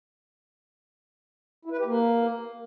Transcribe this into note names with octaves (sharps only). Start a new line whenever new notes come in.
E4
B4
G4
A#3